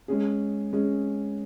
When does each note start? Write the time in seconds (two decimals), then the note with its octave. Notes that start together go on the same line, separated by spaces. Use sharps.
0.08 G#3 C#4 G#4
0.73 G#3 C#4 G#4